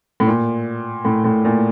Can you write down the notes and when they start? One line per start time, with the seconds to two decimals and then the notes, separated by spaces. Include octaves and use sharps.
0.20 A2
0.27 A#2
1.05 A2
1.24 A2
1.45 A#2